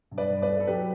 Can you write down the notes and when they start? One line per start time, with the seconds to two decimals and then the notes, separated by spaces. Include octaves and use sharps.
0.11 G2
0.18 B4 D5
0.30 G2
0.42 B4 D5
0.49 A3
0.60 A4
0.67 F#3 G4 B4